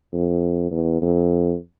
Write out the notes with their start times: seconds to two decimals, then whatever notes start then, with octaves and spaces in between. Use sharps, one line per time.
0.13 F2
0.71 E2
1.01 F2